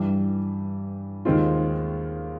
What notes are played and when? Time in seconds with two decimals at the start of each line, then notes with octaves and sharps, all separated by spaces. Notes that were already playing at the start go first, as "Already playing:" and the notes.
Already playing: G2 E3 G3
1.25 D#2 D#3 G#3 C4 F4